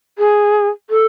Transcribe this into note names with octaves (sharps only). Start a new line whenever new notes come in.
G#4
A4